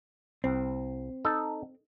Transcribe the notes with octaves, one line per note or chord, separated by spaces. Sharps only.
C2 C4
D#4 A4